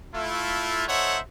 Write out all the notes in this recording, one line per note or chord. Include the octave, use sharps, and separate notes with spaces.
A3 E4 F4
D#4 A4 C5 C#5 E5 F#5